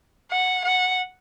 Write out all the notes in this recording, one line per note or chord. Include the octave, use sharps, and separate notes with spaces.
F#5
F#5